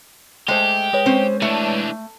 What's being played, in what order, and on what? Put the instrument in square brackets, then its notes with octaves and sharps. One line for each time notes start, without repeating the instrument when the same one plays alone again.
[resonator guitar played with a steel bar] G#3 A3 C5 [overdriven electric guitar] G4
[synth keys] G#3 B4 C#5
[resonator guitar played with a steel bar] C4 C#4 C5
[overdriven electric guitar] E3 D4 [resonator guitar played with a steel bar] A3